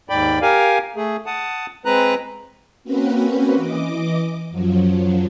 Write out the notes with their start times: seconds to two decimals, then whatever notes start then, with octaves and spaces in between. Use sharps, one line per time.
0.10 D#2 G#2 D5 G5 B5
0.42 G4 A#4 F5 G#5
0.96 A3 G#4
1.26 F#5 A5 D#6
1.85 G#3 C4 B4 A#5 F#6
2.84 A#3 C4 C#4 F#4 B4
3.55 E3 D#5 D6
4.51 F#2 F3 F#3